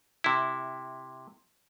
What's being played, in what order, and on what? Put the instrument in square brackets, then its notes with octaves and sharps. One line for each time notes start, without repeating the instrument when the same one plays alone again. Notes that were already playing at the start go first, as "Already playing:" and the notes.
[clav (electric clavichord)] C3 E4